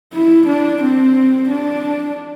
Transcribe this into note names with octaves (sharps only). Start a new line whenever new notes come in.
E4
D4
C4
D4